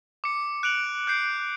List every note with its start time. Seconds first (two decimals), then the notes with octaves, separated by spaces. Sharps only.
0.24 D6 C#7
0.63 F#6 D7 F7 F#7
1.07 F#6 G6 C7 D7